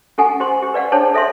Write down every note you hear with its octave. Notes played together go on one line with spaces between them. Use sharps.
C#4 G4 A4 F#5 G#5
G4 C5 C6
G4
B4 D5 F5 F#5
D4 G#4 C5 C#5 A5
A4 E5 F5 C6